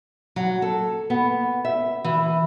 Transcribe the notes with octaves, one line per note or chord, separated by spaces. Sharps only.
F#3
A4
B3
E5
E3